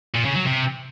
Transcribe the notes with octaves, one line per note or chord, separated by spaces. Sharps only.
A#2
C#3
F#3
C3